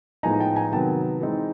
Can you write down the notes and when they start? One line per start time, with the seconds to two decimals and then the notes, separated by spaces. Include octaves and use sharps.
0.23 A2 F3 G#3 B3 D#4 G#5 A#5
0.40 G5 A5
0.56 G#5 A#5
0.72 C3 D#3 F#3 B3 G5 A5
1.21 E3 G#3 C4 D#4